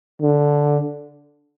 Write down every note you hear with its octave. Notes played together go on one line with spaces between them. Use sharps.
D3